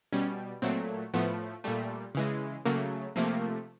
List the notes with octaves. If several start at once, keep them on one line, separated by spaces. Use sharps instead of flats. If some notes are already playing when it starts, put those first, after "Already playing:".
B2 G3 C#4
A#2 F#3 A3 C4
A2 F3 A3 B3
A#2 G3 A3
C#3 E3 G#3
C#3 F#3 A3 A#3
C3 F3 A3 A#3